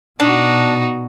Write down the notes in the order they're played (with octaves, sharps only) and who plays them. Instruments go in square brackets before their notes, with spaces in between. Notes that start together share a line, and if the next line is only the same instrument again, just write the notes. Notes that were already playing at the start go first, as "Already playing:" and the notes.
[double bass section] B2 [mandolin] D4 [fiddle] D#4 F#4